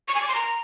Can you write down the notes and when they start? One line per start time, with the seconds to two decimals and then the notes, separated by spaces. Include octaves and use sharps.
0.08 C#6
0.15 G#5
0.22 D6
0.28 C6
0.35 A#5